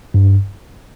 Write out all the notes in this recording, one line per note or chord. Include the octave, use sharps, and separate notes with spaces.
G2